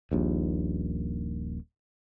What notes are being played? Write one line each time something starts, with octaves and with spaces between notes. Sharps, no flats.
D#1 A#1 D#2